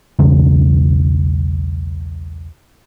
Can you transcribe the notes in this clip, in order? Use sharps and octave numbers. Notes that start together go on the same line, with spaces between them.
B1 E2 C#3 G#3